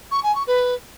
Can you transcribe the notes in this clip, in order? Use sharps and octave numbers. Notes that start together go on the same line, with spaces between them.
C#6
G#5
C#6
B4